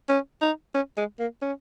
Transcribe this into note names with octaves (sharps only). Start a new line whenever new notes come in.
C#4
D#4
C#4
G#3
A#3
C#4